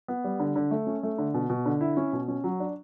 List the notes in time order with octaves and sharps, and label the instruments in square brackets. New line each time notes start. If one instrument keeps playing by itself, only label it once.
[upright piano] B3
G3
D3
D3
A3
C#4
A3
D3
B2
B2
D3
E4
C#4
B2
C#4
F#3
D4